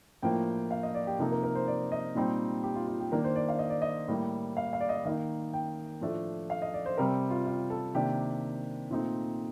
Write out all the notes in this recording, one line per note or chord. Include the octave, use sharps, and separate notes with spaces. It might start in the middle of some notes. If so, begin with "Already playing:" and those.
A2 F3 A#3 D4 G5
F5
D#5
D5
G4
C3 F3 A#3 D#4 A4
A#4
A#4
C5
D5
D#5
A#2 G3 C4 D#4 G4
G4
F4
F4
G4
D#3 A#3 D4 A#4
C5
D5
F5
D#5
D5
D#5
A2 G3 A#3
F5
F5
D5
D#5
D#3 A#3 D#4 F5
G5
A2 F3 A3 D4
F5
D#5
D5
C5
C3 G3 C4 A#4
F4
F4
A4
C3 D#3 A#3 D4 G4
A#2 A3 C4 D#4